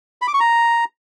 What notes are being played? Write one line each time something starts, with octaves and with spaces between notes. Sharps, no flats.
B5
D6
C#6
A#5